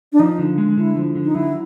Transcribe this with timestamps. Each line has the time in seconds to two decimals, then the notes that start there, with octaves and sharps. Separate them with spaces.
0.13 D4
0.19 F3 D#4
0.39 D3
0.58 G#3
0.77 D3 E4
0.96 F3
1.16 D3
1.24 D#4
1.35 F#3 E4